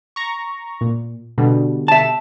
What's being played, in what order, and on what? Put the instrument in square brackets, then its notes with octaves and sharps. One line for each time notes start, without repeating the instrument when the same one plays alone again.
[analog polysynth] A#5 C#6
A#2
B2 D3 G3
[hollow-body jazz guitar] E5 A5